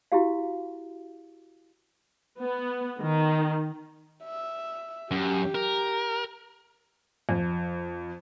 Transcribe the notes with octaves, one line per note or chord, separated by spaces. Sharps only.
E4 F#4 G4 F5
B3
D#3
E5
F#2 G4
A#4
F2